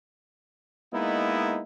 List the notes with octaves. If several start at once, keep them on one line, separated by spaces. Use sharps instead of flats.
G#3 A#3 B3 D#4 E4